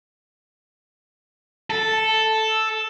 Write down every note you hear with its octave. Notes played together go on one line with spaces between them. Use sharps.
A4